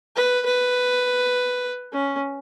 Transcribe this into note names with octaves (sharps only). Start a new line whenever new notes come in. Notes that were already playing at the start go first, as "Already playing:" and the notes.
B4
B4
C#4